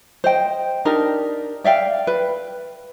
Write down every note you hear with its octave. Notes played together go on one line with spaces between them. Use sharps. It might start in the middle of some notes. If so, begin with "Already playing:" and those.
C5 D#5 G5
D4 D#4 G4 A#4
D5 E5 F5 G5
B4